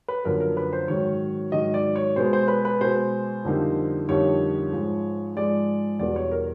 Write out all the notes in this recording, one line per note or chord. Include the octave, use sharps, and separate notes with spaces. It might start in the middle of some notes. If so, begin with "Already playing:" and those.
B4
F#2 D3 F3 A#3 A#4
A#4
B4
C5
G#2 D#3 F#3 C#5
G#2 D#3 F#3 D#5
D5
C#5
B2 G#3 B3 C5
C5
B4
B4
B2 G#3 B3 C5
F2 D3 G3 A#3 D#4
F2 D3 G3 A#3 D#4 C#5
G#2 F3 G#3
G#2 F3 G#3 D5
E2 B2 G3 B3 D5
C#5
A#4